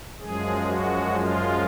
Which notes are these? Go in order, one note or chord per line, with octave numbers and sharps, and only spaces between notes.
F#2 F3 G#3 G#4
F#4
F4